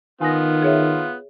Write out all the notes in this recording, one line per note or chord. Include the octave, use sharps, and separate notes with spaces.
D#3 B3 F4 G#5 D#6 A#6
G#4 C#5 E5